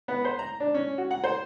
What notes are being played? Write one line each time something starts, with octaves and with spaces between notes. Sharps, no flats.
B3
C5
A#5
D4
C#4
F#4
F#5
C5